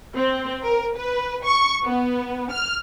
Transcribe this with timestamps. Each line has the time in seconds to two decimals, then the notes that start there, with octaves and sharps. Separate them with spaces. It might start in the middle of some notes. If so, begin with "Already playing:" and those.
0.15 C4
0.63 A#4
0.97 B4
1.44 C#6
1.84 B3
2.51 F6